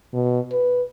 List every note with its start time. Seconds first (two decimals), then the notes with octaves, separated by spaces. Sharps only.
0.13 B2
0.52 B4